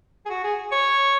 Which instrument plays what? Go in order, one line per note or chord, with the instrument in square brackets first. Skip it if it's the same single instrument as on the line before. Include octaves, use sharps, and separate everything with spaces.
[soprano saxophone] G#4
F#4
G#4
C#5